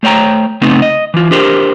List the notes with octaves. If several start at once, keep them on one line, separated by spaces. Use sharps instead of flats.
A3 C5 C#5 G5 A#5
C#3 A3 B3 C4 D#4
D#5
E3 F4
D4 G4 A#4 C5